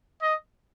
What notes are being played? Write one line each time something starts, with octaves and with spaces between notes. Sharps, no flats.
D#5